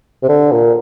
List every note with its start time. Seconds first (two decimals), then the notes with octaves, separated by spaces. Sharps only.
0.23 C3
0.29 D3
0.52 A#2